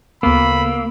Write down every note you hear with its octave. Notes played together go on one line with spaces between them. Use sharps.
D2 C#3 A#3 B3 B5 E6